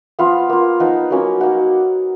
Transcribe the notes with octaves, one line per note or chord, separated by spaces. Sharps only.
F3 B3 F4 F5
A#3 F4
F3 B3 D#4 F#5
F#3 A#3 C#4
F#3 A#3 D#4 F#5